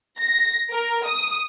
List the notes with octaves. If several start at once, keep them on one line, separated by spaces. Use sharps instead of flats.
A#6
A#4
D#6